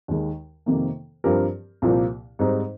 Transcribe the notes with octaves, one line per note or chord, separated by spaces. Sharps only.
D#2 D#3 G#3
F2 C3 D#3 A#3
G2 F3 C4 G4 A#4
C2 A#2 F3 A#3
G#2 G3 C4 D#4